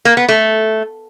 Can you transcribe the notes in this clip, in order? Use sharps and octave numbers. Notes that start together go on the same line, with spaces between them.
A#3
B3
A3